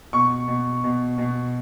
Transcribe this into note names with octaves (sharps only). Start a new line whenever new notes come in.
B2 C#6
B2
B2
B2